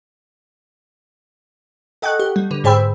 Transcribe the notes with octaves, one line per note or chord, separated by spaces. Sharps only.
A4 D#5 F#5 G5 C#6 F#6
G4
G3
D3 B4
G#2 G#4 C5 G5 B5 E6